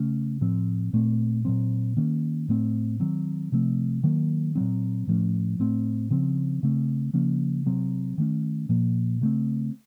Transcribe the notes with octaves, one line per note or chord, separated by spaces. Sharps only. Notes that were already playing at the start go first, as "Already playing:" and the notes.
Already playing: C#3 A3 C#4
A2 F3 C4
A#2 A3 C4
A#2 F#3 C4
D#3 A#3 C#4
A2 A3 C4
D#3 F#3 C4
C3 F3 A3 C4
D#3 F#3 A#3
A#2 F#3 C4
A2 F3 A3 C#4
A2 A3 C4
C#3 F3 C4
C#3 A3 C4
C#3 F3 A#3 C#4
C3 F#3 C4
D#3 A3 C#4
A#2 F3 A#3
C#3 A3 C4